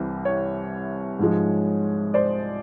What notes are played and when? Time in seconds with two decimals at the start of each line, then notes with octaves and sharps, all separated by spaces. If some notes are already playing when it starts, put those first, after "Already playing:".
Already playing: C2 C3 E3 G3
0.25 C#5
1.19 G#2 F3 G#3
2.14 C5 D5